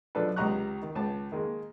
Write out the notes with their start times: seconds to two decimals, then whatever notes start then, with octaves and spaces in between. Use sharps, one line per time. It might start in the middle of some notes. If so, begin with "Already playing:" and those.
0.15 B1 F3 D4 A4 B4
0.36 C#2 C3 D#5 A#5 C#6 F#6
0.82 D#3
0.95 C#2 A5
1.32 D#3 G#3 A#3